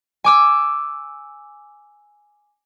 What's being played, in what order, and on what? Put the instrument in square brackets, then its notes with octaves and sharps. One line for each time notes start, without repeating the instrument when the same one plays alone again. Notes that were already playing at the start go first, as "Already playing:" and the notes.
[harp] G#5 D6 E6